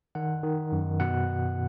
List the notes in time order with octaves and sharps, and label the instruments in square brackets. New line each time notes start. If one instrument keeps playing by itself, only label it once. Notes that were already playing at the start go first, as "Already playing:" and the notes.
[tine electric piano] D#3 F#5
D#3
F#2
B2 F#5